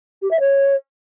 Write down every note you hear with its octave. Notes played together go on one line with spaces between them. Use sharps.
G4
E5
C#5